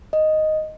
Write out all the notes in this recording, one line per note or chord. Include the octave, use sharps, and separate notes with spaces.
D#5